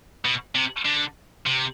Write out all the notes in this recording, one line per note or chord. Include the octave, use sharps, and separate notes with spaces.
B2
C3
D3
C3